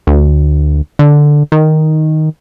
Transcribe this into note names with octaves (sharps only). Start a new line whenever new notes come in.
D2
D3
D#3